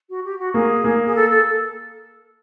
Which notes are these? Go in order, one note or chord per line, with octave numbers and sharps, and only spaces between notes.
F#4
G4
F#4
A#3 G#4
A#3
G#4
A4
A4